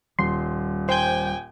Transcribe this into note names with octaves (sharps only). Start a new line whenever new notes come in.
D#1 G3 C6
C5 G5 G#5 G6